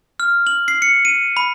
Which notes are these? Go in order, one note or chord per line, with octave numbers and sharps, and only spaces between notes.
F6
F#7
C7
C#7
D#7
B5